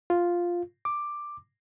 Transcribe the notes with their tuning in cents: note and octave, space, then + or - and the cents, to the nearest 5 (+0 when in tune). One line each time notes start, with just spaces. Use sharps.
F4 +0
D6 +5